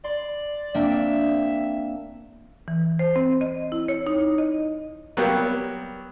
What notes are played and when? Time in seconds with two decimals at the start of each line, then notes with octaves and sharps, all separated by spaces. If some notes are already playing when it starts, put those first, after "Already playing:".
0.04 D5 C6
0.75 A#3 C4 D4 E5
2.68 E3
2.99 C5
3.16 C4
3.41 D#5
3.72 E4
3.88 C#5
4.07 D#4
4.38 D#5
5.17 F#3 G3 A#3 B3 G4